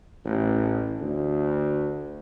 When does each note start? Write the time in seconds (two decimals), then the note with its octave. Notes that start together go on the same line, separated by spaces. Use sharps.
0.25 A1
1.01 D2